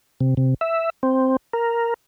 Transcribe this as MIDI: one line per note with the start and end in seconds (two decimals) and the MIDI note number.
0.20 0.34 48
0.37 0.54 48
0.61 0.90 76
1.03 1.36 60
1.53 1.94 70